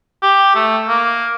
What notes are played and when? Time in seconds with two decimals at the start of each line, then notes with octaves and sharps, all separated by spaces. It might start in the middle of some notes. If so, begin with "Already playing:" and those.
0.22 G4
0.55 A3
0.88 A#3